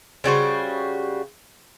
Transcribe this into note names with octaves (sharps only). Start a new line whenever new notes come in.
C#3 G3 F#4 C5